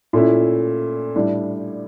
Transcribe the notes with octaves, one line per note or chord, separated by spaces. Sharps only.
A#2 A3 C#4 E4
A2 G3 D4